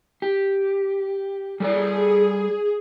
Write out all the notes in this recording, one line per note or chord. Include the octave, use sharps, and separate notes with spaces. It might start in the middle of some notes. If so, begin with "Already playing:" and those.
G4
G3 G#4 A4 D5